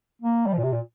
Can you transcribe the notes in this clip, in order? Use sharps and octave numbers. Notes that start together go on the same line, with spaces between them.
A#3
G3
F3
A#2
C3
A#2